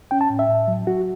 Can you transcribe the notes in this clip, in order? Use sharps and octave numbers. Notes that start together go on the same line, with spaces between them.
C#4 G5
A5
A2
E5
A2
F#3
F#3 F#4